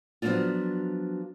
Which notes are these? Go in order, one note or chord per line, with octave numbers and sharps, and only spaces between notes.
F3 F#3 B3 C4 D4 F4